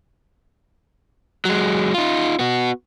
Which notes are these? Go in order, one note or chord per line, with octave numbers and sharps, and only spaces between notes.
F#3 G#3
D#4 F4
B3 F#4